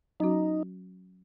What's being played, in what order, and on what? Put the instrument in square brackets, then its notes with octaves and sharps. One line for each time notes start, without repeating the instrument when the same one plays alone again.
[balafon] F#3 C#4 F#4 [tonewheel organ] D#4